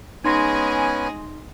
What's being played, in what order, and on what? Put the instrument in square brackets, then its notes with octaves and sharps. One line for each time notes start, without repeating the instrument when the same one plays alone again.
[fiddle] G#3 G#4 [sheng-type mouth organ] B3 C#4 G#5 [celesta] D#4 C6 A#6